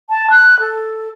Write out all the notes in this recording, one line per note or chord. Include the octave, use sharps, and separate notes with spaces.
A5
F#6
A4